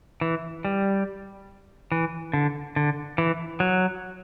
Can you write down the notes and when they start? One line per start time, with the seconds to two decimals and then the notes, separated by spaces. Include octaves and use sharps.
0.21 E3
0.65 G3
1.92 E3
2.33 D3
2.76 D3
3.18 E3
3.60 F#3